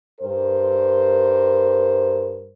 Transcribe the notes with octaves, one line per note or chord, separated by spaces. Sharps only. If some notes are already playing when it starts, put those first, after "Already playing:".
G2 A#4 C5